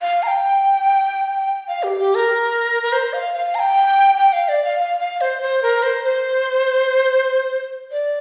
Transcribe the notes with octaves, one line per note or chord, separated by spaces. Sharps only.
F5
A#5
G5
F5
G4
G4
A#4
A#4
C5
F5
F5
A#5
G5
G5
F5
D5
F5
F5
F5
C5
C5
A#4
C5
C5
D5